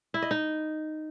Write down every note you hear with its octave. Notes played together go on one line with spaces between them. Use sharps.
E4
D#5
D#4